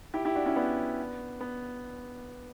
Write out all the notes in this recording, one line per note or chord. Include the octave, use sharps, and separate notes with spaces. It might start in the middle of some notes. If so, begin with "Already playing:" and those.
E4 G4
E4 G4
D4 F#4
C#4 E4
B3 D4
B3